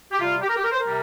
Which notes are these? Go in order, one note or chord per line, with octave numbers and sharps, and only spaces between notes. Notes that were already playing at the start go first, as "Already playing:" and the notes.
G4
C3 G3 F4
G4
A#4
G4
A#4
C5
A#4
C3 G3